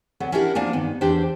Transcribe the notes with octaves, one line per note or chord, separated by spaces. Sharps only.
D2 F#3 B3
C#4 D4 E4 F#4 G4 A#4
F3 A#3 D4 G#5
G2 D#3 B3
E2 E3 D4 G4 C5 G5